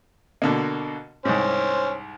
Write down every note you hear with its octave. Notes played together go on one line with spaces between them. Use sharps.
B2 D3 A#3
C2 G#2 C#4 C5